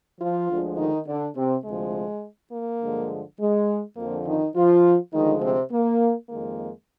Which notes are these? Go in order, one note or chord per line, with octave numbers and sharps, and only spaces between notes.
F3 F4
D2 D3 F3 G#3
D#3 D#4
D3 D4
C3 C4
D2 C3 F3 G#3
A#3
G2 D3 F3 G#3
G#3
F2 D3 F3 A#3
D#3 D#4
F3 F4
D2 D3 D#3 F3 G#3 D#4
C3 C4
A#3
F2 D#3 G#3 A#3